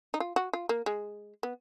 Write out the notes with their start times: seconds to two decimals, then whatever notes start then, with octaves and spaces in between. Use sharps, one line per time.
0.14 D#4
0.20 F4
0.36 F#4
0.53 F4
0.69 A#3
0.86 G#3
1.43 B3